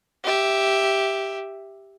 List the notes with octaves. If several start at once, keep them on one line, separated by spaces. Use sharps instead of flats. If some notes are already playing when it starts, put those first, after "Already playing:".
G4 E5